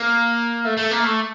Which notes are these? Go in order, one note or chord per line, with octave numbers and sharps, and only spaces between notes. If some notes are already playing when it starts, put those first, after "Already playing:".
Already playing: A#3
A3
A3
A#3
A3